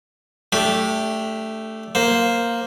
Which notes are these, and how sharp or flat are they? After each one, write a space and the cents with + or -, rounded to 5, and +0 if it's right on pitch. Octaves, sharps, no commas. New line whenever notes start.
A3 +0 D4 -25 G4 +0
A#3 +0 C5 +0